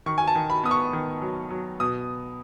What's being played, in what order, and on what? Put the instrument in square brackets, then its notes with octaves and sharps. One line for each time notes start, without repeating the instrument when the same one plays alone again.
[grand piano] D#3 C#6
G#5
A5
D#3
B5
B3 D#6
C#6
D#3
F#3
F#3
B2 D#6